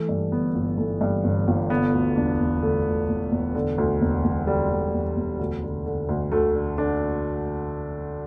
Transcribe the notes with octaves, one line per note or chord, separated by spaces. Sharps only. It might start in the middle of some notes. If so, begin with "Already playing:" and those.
Already playing: E3 A3
G2
G1 B3
G1
E3 A3
G2
G1
G1
D3 B3
D2
E1 D4
E1
D3 A3
D2
E1
E1
D3
D2
E1
E1
D3 G3
D2
E1
E1
D2
D3
D3
D2
D2 A3
D3
D3 D4